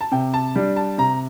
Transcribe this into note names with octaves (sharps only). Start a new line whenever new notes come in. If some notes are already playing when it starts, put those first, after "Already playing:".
A5
C3 G5
A5
G3 D4
A5
C3 A#5